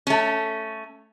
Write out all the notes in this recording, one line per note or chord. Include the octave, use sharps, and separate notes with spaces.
A3 C#4